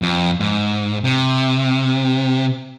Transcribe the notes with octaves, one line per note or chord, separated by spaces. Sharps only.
F2
G#2
C3